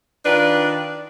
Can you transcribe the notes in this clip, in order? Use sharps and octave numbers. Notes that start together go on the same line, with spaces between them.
D#3 D4 F4 B4